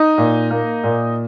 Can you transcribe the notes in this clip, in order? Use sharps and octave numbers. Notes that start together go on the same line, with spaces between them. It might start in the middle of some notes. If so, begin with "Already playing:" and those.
Already playing: D#4 D#5
A#2
A#3
A#2